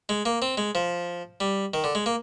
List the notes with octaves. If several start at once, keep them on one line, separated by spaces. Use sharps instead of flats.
G#3
A#3
C4
G#3
F3
G3
D#3
D3
G#3
A#3